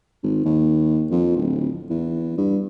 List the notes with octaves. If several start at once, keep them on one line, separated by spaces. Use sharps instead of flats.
G#1
D#2
F2
D1
E2
G2